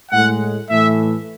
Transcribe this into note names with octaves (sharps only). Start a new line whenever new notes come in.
A2 G#3 F#5
A2 E3 A3 E5